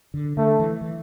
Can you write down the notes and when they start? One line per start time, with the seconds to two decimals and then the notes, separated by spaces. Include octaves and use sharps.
0.14 D3
0.37 D3 A3
0.60 E3
0.81 E3